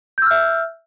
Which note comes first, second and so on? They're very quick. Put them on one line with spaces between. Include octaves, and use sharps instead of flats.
G6 E6 F6 E5